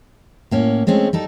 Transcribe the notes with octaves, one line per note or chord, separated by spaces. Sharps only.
A2 A#3 C#4
G#3 A3 C4 C#4
G3 D#4 A4